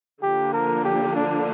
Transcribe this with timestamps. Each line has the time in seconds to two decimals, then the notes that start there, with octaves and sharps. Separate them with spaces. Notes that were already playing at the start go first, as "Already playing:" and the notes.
0.22 D3 F3 A#3 G4
0.53 A#4
0.85 G4
1.16 D4